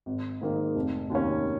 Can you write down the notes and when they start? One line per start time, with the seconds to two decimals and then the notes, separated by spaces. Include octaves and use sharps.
0.06 G#1
0.41 G#2 D#3 A#3
0.75 F1
1.10 D#2 D#3 C#4